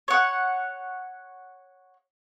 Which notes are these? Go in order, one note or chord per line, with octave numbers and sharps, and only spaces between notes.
C#5 F#5